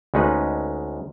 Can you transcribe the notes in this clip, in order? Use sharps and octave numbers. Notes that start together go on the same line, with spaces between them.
D2 G#3 C#4 D#4 B4